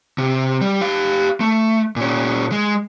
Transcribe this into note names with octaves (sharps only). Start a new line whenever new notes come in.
C3
G3
G4 F5
A3
A#2 C#4
G#3